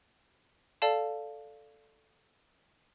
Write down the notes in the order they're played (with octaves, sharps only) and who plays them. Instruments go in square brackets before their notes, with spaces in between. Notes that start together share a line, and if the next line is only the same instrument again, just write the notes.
[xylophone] A4 D5 F5 A5